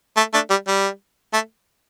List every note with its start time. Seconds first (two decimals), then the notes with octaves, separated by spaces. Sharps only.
0.17 A3
0.34 A3 D4
0.50 G3
0.67 G3
1.33 A3